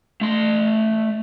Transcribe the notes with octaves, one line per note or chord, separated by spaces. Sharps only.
A3 C6